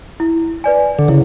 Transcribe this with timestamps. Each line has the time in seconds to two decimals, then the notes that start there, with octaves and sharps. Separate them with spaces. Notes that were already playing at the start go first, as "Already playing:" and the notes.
0.20 E4
0.64 B4 D5 G#5
0.99 D3
1.08 C#3 E4